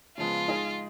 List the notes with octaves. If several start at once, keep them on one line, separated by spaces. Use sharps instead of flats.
C#3 F3 G#3 B3 F4
G#3 D#4 G#4 D#5